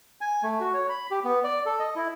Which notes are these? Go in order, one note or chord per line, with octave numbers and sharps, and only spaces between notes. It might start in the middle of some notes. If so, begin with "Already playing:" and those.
G#5
A3
F#4
C#5
B5
G4
B3
D5
A4
D#5
E4